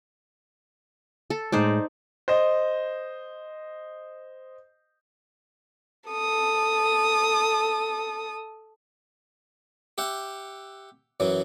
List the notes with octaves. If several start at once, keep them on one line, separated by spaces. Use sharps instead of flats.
A4
A2 G#3 D#4 C5 D5
C5 D#5
A4 D#6
G4 E5 F#5
F#2 E3 F#3